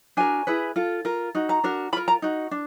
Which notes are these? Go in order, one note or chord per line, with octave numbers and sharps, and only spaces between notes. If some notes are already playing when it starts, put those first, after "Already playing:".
D4 F#4 A#4 G#5
E4 G#4 B4
F4 A4
F4 A#4
D#4 F#4
A#5
D4 F#4 A#4
F4 A#4 B5
A#5
D#4 F#4
D4